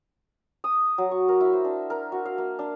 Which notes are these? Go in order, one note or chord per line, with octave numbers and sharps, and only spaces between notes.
D#6
F#3
C#6
A#4
E4
C5
D4
A#4
F#4
F5
A#3
D4